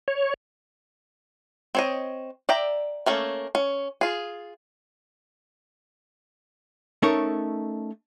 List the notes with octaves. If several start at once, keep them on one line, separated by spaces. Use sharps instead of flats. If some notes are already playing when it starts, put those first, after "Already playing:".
C#5
C4 C#5 D#5
D5 E5 G5 A#5
A3 A#3 C#4 A4
C#4
F4 G#4
A3 C#4 D#4 A4 A#4 C#5